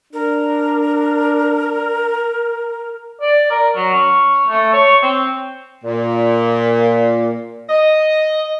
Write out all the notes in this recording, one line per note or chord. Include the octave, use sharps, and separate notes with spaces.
D4 A#4
D5
A#4
F#3
C#4
A3
C#5
C4
A#2
D#5